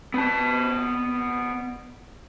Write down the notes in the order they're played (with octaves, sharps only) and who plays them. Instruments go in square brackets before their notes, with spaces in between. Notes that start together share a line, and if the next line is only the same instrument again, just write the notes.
[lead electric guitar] B3 A5